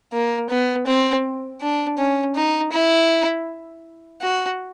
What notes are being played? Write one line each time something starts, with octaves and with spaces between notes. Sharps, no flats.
A#3
B3
C4
D4
C#4
D#4
E4
F#4